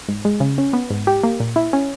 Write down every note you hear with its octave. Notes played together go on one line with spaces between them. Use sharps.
G#2
G#3
C#3
C#4
B3
G#2
G4
A#3
A#2
E4
C#4